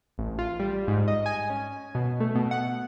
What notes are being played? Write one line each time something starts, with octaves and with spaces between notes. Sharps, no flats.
A1
F4
G3
G#2
D#5
G#5
C#4
B2
A3
B2
F#5